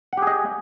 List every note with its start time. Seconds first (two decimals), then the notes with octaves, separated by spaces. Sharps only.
0.13 F#5
0.17 G4
0.22 G#4
0.27 D#5